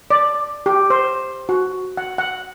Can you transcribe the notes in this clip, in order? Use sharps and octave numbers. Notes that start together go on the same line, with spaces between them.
D5
G4
C5
F#4
F#5
F#5